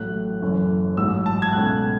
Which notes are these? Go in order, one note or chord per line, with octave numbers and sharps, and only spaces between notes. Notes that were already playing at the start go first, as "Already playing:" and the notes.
Already playing: A1 A2 F#3 A3 F#6
F#1 F#2 E3 A3 C#4
A1 G#2 F#3 E6
A5
G#6
C#2 B2 A3 C#4 F#6